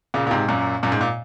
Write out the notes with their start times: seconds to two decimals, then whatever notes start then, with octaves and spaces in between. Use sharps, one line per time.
0.14 A#2 C#3
0.27 A#2
0.31 G#2 C3
0.48 F#2 A#2
0.83 F#2 A#2
0.92 G#2
1.01 A#2